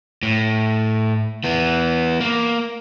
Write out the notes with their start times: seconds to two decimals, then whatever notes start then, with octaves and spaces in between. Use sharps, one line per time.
0.23 A2
1.44 E3 B3
2.20 A#3